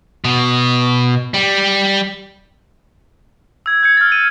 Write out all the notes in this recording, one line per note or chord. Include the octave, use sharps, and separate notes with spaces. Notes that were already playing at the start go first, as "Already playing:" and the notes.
B2
G3
E6 G#6
G6 G#6 C#7
F6 A6
D#7